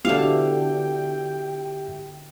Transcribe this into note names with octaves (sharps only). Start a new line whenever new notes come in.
D3 B3 E4 F#4 G4 E5 F5 G5